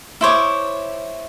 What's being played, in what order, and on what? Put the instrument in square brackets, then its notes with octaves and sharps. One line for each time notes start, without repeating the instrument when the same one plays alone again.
[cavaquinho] E4 C5 C#5 D6